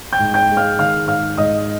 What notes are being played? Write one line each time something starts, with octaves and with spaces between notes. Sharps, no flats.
G5 G6
G#2
G5 G6
G#3
F5 F6
D#3 F5 F6
G#2 F5 F6
G#2 D#5 D#6